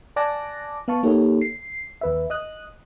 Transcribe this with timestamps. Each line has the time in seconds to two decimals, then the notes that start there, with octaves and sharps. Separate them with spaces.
0.16 D5 G#5 A5 D6 F#6 A#6
0.88 B3 F5 A5 C#6
1.03 A#3 D#4 G4 A4 C#5
1.42 C7
2.01 D#2 B4 E5
2.30 D#5 D#6 F#6